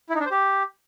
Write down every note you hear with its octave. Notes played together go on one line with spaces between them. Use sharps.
E4
D#4
D4
C5
G4